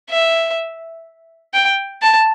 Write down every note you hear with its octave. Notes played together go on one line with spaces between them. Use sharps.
E5
G5
A5